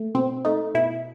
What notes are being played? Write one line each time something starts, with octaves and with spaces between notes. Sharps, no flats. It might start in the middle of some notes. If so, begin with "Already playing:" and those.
Already playing: A3
B2 C4
A3 D#4
B2 E4